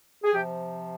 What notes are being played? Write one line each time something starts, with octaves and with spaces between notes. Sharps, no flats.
G#4
C3 F3 G4